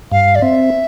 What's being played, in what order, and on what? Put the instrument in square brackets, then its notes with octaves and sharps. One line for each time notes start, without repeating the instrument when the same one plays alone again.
[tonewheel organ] G2 [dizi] F5
[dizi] D5
[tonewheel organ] C4 [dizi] E5